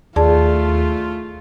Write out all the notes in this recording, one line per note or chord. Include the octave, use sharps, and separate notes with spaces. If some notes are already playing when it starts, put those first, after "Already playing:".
D#2 A3 F4 G#4 D5 A5